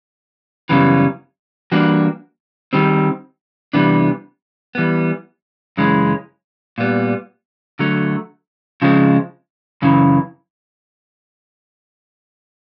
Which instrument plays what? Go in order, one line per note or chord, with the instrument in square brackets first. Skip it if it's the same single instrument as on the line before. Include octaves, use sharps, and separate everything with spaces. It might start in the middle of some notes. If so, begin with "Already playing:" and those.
[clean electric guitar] F#2 C#3 E3 G3 B3
E3 G3 A#3 D4 F#4
D#3 G3 C4
C3 E3 G3 B3 D4
E3 G3 B3
F#2 C#3 E3 G#3 C#4
A#2 G3 B3
D3 F#3 A3
C#3 F3 G#3 C4
F#2 C#3 E3